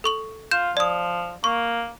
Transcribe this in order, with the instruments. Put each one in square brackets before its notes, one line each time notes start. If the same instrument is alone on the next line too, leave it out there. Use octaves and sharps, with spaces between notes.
[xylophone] A4 C#6 F#7
[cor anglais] F4 [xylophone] G6 E7
[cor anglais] F3 [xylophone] D5 D#6
[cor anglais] A#3 [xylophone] C#6